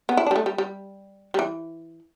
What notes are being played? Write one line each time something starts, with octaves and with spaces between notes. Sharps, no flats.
B3
E4
D4
G3
A3
G3
G3
G3
E3